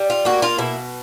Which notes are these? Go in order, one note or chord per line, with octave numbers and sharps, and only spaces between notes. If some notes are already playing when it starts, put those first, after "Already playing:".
Already playing: G3
F4
A#3 F#4
F4
B2 E4